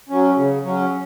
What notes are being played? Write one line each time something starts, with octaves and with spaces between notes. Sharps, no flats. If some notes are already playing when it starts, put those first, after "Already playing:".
F#3 C#4
C#3
F#3 C#4